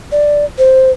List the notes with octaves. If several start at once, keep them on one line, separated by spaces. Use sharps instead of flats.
D5
C5